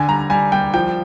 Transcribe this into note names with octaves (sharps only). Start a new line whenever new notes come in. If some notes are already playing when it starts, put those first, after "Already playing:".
Already playing: D3 G#5
G3 A#5
G3 G#5
G3 G5
F3 G5